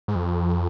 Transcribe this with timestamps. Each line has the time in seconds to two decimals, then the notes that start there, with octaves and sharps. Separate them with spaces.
0.08 G#2
0.15 F2